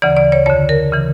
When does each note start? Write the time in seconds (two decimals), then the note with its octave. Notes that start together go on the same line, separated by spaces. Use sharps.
0.02 D2 C#3 E3 D5
0.17 D5
0.32 C#5
0.46 F2 D3 C#5
0.69 A#4
0.92 C#3 E3